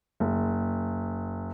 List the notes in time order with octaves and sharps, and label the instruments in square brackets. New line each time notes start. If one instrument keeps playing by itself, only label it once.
[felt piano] F#1